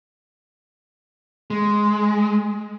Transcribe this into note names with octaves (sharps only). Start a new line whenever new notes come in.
G#3